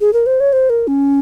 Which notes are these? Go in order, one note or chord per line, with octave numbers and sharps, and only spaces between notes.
G#4
A#4
C5
C#5
C5
A#4
C#4